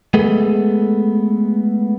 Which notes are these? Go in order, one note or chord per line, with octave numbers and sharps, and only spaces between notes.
G#3 A3 B3 G#4 A4